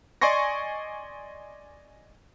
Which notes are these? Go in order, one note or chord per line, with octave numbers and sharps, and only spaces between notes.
D5 D#5 G#5 C6 C#6 A#6